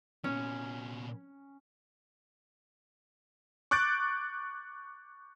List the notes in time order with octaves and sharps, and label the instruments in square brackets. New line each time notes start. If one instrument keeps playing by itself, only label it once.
[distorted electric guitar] A#2 B3 [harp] C#4
[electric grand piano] C#6 D6 F#6 G6 A6 D7